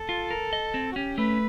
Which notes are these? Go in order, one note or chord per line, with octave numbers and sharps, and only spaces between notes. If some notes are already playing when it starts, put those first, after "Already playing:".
Already playing: A4
F4
A#4
D#5
C4
F#4
C#4 G4
A3 B4